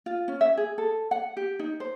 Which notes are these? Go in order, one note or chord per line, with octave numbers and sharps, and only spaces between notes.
F4
C#4
E5
G#4
A4
F#5
G4
D#4
C5